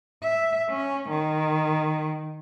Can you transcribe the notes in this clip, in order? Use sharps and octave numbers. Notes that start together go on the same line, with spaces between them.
E5
C#4
D#3